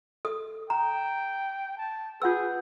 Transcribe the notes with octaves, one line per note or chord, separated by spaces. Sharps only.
A4 D#6
G5 A#5
A5
F4 G#4 B4 F#5 E6 G6